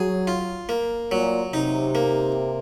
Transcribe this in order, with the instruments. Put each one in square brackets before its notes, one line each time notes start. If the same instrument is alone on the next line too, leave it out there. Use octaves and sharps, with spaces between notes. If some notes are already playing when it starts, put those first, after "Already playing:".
Already playing: [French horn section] F#3 [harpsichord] G#4
[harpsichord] F4
A#3
[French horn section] A#2 [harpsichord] F#3
[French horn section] C3 [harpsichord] D#4
[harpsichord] A#3